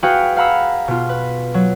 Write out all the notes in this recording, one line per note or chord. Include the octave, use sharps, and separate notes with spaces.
F#4 G#4 B4 F5 G5
F5 F#5 A#5 B5 E6
B2 F4
B4
F#3